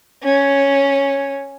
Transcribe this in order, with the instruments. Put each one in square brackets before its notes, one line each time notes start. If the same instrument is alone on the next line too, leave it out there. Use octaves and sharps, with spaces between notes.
[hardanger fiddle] C#4